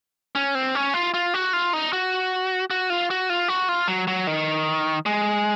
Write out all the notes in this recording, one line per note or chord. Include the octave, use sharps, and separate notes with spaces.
C#4
C4
C#4
F4
F4
F#4
F4
D#4
F#4
F#4
F4
F#4
F4
F#4
F4
F#3
F#3
D#3
G#3